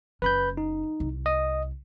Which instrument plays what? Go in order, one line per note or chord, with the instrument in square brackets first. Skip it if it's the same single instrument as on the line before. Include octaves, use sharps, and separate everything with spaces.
[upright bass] F#1 C#4 [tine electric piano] B4 B5 G6
[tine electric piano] D#4
[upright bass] C2
[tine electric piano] D#5 D#6